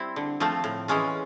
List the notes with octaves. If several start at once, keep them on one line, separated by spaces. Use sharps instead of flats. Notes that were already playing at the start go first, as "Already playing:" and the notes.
Already playing: G3 C4 E4
D3
F3 A3 C4 F4
A2
E3 G#3 C#4 F4